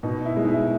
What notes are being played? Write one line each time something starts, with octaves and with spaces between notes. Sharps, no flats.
B2 D#4
E4
G#3
D#4
E4